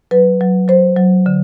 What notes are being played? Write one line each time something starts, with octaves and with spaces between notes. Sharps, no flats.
F#3 B4
F#3
F#3 C5
F#3
D3